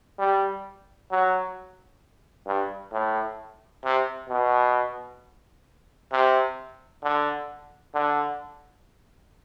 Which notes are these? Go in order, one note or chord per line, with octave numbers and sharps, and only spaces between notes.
G3
F#3
G2
A2
C3
B2
C3
D3
D3